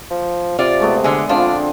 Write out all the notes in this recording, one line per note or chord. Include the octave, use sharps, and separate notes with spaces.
F3
C3 F4 D5
G#3 A3 B3
D3 G#3 E5 G#5
D3 F3 C4 D4 F4